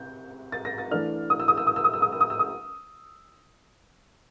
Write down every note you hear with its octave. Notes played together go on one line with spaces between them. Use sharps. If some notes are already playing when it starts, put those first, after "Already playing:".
Already playing: C3 G6
A6
A#6
A6
E3 A3 D4 F6
D#6
E6
D#6
E6
D#6
E6
D#6
E6
D#6
E6
D#6
E6
D#6